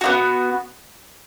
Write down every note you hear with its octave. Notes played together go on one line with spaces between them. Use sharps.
B3 D#4 F#4